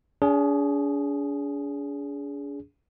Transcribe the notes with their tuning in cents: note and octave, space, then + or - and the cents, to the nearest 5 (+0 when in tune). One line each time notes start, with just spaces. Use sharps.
D4 -45 G#4 +0